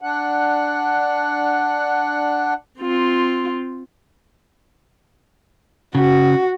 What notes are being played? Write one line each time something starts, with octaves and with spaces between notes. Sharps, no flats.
D4 F#5
C4 F4
C#3 F#4